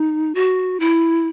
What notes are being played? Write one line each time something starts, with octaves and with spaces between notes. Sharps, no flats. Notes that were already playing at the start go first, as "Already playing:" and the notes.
Already playing: D#4
F#4
E4